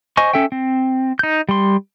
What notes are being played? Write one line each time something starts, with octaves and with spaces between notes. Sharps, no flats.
C5 D#5 G#5 C#6
C#4 A4 E5 G5
C4
D#4 G6
G3 C6